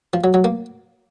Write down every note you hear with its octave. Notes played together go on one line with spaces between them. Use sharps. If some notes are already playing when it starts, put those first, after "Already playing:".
F3
F#3
F#3
A#3